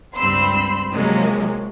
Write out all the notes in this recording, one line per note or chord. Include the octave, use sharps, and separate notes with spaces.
C#2 G2 C4 B5 C6 E6
C3 F3 F#3 G#3 A#3 C#4